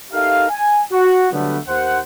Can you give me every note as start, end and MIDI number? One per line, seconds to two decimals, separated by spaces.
0.12 0.45 63
0.12 0.45 67
0.12 0.45 69
0.12 0.45 70
0.12 0.45 76
0.12 0.45 77
0.49 0.82 80
0.92 1.29 66
1.32 1.58 50
1.32 1.58 54
1.32 1.58 55
1.32 1.58 57
1.32 1.58 59
1.68 1.99 39
1.68 1.99 72
1.68 1.99 78